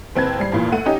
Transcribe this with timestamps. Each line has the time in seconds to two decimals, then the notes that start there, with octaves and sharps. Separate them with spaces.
0.16 F#1 C4 B4 G#6
0.39 G#1 G3 C7
0.52 E2 G2 A#2
0.72 A3 F#5 D#7
0.86 C#4 D#4 G4